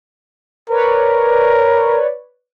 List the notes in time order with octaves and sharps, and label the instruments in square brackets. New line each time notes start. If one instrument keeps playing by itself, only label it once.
[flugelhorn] A#4 [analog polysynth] B4 C#5 D5